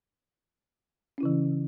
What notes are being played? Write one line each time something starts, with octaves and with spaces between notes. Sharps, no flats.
C#3 E3 C#4 E4